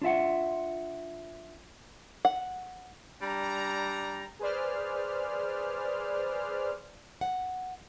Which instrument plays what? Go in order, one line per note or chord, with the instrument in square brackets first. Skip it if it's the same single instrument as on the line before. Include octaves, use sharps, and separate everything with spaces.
[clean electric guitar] D4 F4 E5 F#5
[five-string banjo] F#5
[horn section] G3 D4 A#5
[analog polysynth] G#4 B4 C5 D5 F6
[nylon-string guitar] F#5